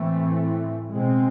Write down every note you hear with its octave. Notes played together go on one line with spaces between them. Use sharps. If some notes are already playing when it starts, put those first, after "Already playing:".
Already playing: A2 E3 A3 C4
B2 G#3 C4